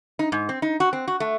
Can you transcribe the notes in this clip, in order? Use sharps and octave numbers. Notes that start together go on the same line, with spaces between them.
D#4
G#2
C4
D#4
F#4
C4
F#4
A3